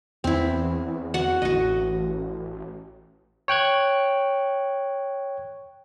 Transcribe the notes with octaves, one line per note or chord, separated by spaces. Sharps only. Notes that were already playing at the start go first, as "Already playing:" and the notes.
E2 C4 E4
F#4 F#5
A1 F#4 D#5
C#5 G5 F#6 G#6